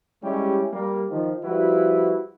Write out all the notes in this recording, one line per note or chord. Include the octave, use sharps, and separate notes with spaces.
G3 G#3 C#4 E4 G4
G3 A#3
D#3 F3
F3 G3 E4 F#4 B4